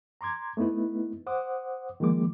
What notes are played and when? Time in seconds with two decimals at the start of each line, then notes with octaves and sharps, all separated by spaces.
0.21 A#5 C6 D6 G#6
0.57 A3 B3 D#4 E4 B4
1.27 C5 F#5 D6 D#6
2.00 D#3 F3 G#3 A#3 D6